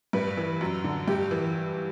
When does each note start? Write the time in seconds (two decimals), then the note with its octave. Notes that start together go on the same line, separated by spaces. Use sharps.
0.13 G2 B4
0.37 E3
0.61 F#2
0.84 D3
1.08 G2 G4
1.31 E3